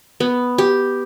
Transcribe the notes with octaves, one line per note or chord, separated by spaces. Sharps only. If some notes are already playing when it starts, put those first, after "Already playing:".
B3
G4